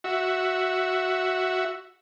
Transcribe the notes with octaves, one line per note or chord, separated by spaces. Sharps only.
F#4 E5